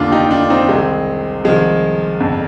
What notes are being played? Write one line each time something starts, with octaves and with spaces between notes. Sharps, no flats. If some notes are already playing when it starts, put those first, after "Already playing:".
Already playing: F1 D#2 D3 D4 F4
D#4 G4
D4 F4
C4 D#4
C2 C3 D#3 G#3 C4
C2 C3 D#3 F3 G#3
G1 F2 D3